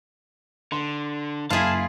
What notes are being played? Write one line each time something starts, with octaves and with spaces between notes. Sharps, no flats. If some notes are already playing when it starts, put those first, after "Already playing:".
D3 C6
F#1 E4 F4 G#4 F5 A5